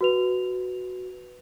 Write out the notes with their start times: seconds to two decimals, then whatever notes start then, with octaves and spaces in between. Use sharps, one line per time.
0.01 F#4 B4 F7